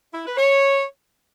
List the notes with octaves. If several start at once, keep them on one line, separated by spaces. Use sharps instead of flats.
E4
B4
C#5